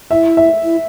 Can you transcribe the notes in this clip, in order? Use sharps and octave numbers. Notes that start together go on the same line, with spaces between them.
E4 E5
E5
E4